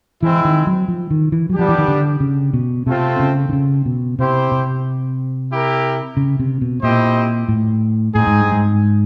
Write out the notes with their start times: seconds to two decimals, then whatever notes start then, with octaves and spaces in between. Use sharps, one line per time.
0.22 E3 G#3 C4 E4
0.45 D#3
0.67 F#3
0.88 F3
1.11 D#3
1.32 E3
1.50 F#3
1.54 F3 G3 B3 D4 G4
1.69 E3
1.78 D#3
1.88 D3
2.20 C#3
2.53 B2
2.86 C3 A3 C4 F4 A4
3.20 C#3
3.49 D3
3.53 C#3
3.86 B2
4.18 C3 E4 G4 C5
4.52 C3
5.51 E4 G4 A#4
6.17 C#3
6.39 C3
6.61 B2
6.83 A#2 C4 E4 G4 C5 D#5
7.48 A2
8.15 A2 C4 D#4 G#4
8.27 G#2
8.40 G2
8.52 G#2